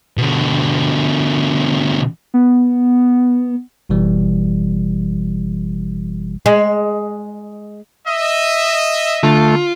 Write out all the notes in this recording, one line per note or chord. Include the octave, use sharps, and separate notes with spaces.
B2 D3
B3
G1 B2 E3 G3
G#3
D#5 E5
D3 A3 F4